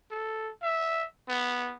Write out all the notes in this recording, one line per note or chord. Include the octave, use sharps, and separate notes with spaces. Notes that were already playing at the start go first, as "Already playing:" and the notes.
A4
E5
B3